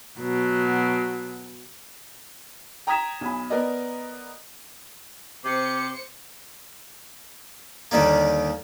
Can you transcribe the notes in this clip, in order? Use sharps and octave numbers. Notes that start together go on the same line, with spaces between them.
B2 F#3
G5 A#5 D#6 G#6 B6 E7
B1 G#5 B5
B3 A#4 D5 D#5
C3 C5 D6 C#7
D#2 D3 D#3 G3 A#3